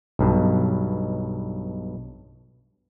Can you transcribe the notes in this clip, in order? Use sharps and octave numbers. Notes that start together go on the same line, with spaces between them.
B1 G2 B2